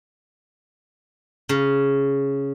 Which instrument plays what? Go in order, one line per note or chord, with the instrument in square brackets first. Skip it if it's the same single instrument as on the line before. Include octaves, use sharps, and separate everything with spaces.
[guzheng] C#3